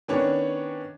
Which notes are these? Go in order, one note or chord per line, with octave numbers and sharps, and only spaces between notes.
D#3 B3 C#4 D4 C#5